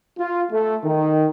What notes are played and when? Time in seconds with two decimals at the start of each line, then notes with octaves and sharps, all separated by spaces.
0.19 F4
0.52 A3
0.84 D#3